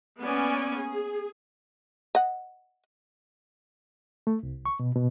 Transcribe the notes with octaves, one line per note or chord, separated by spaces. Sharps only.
A#3 B3 C#4 D5 G#5
G#4
D#5 F#5
A3
C2
C#6
B2
B2